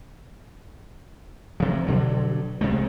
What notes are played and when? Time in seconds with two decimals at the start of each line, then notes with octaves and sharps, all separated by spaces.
1.60 G2 C3 F3
1.87 G2 B2 D3 F#3
2.61 C2 C3 G#3 A3